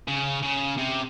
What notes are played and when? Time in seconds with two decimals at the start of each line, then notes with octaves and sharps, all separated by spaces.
0.08 C#3
0.42 C#3
0.77 C3